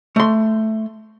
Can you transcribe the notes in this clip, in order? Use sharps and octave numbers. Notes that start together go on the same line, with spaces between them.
A3 C6